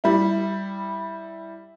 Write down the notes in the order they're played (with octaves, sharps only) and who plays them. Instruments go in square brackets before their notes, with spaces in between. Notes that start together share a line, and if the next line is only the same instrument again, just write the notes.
[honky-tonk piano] G3 E4